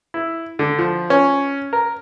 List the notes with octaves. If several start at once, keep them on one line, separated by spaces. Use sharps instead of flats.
E4
D3
F3
C#4
A#4